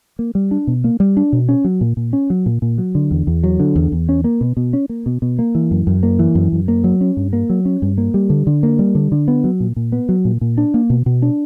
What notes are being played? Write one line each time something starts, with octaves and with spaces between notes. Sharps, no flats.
A#3
G3
D4
B2
A#3
G3
D4
B2
C#4
F#3
A#2
A#2
C#4
F#3
A#2
A#2
F#3
D3
E2
E2
F#3
D3
E2
E2
C#4
A#3
B2
B2
C#4
A#3
B2
B2
A#3
E3
F#2
F#2
A#3
E3
F#2
F#2
A#3
F#3
C#4
G2
A#3
F#3
C#4
G2
A#3
G3
D3
D3
A#3
G3
D3
D3
B3
F#3
A#2
A#2
B3
F#3
A#2
A#2
D4
A#3
B2
B2
D4